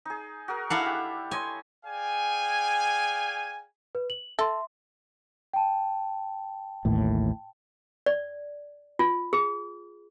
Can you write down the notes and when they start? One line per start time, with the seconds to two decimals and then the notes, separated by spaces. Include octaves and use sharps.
0.05 D#4 G#4
0.48 F#4 G#4 A#4
0.70 D4 E4 G#4 A4 F5 F#5
0.86 G4
1.31 C#5 D#5 G#5 C6
1.85 G#4 D5 F5 G5 G#5
3.95 B4
4.10 F#7
4.39 A4 E5 C6
5.54 G5 A5
6.85 A1 D#2 A2
8.06 D5
8.99 F4
9.33 G#4